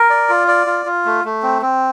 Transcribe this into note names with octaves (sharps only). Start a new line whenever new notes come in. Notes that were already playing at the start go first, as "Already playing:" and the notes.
Already playing: A#4
D5
F4
D5
F4
F4
A3
A3
C4
C4